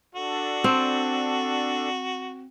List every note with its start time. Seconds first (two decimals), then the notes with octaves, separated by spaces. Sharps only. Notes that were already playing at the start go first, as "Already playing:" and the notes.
0.15 D4 F#4 A4
0.64 C4